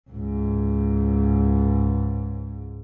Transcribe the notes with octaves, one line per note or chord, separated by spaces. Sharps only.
C#2 G#2